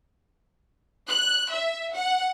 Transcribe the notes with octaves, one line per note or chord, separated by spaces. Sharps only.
F#6
E5
F#5